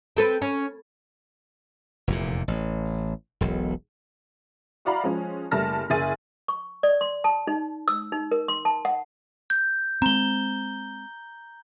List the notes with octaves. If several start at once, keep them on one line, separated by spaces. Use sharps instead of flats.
C4 A4 B4
C#4
F1 E2 A#2
A1
E1 B1
E4 F#4 D5 F5 A#5 B5
F3 G#3 C#4
F#1 G3 A3 A5 F6 A#6
F#1 G#4 E5 G#5 A6 D#7
C#6
D5
C6
A5
D#4
E6
D#4
A#4
C6
A5
F#5
G6
G#3 C4 A#5 G7